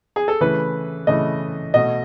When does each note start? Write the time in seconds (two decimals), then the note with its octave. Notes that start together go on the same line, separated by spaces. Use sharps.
0.16 G#4
0.28 A4
0.41 C#3 E3 A3 B4
1.07 C#3 E3 A3 D#5
1.74 B2 A3 D#5